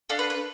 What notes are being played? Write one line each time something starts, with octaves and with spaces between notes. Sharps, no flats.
D4 A4 F5
B4
B4